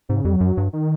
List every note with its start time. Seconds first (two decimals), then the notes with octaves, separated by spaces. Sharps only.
0.09 G#2 C3
0.17 C#3
0.25 F2 G3
0.33 F#3
0.41 F#2
0.57 G2
0.73 D#3